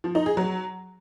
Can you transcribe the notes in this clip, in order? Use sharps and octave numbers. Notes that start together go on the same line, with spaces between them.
F3
D#4
G#4
F#3